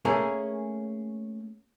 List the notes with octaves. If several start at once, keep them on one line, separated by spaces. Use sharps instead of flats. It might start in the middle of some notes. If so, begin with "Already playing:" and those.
A3 A#3 C#4 G#4 A#4 G#5